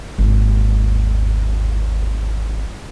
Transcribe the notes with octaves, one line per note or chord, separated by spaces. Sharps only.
G#1 D#2